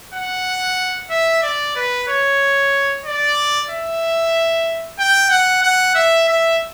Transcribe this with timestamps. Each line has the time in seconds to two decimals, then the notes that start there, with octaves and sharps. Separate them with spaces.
0.14 F#5
1.10 E5
1.42 D5
1.76 B4
2.08 C#5
3.05 D5
3.70 E5
4.99 G5
5.30 F#5
5.63 F#5
5.95 E5
6.28 E5